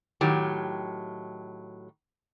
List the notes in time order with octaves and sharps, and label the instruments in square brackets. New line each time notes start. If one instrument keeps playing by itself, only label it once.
[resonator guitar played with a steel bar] A2 D#3 F#3 G4